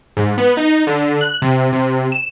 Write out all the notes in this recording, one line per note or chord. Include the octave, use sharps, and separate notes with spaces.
G#2
B3
D#4
D3
F#6
C3
C3
E7